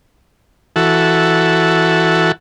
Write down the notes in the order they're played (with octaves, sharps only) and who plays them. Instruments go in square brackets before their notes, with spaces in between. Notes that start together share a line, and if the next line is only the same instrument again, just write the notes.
[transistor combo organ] E3 F#4 A4